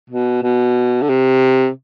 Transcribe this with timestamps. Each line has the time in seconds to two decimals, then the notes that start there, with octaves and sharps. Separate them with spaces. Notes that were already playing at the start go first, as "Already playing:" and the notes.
0.10 B2
0.43 B2
1.02 D3
1.09 C3